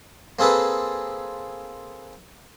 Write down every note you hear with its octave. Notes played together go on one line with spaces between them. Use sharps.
A#3 C4 G#4 A4 B4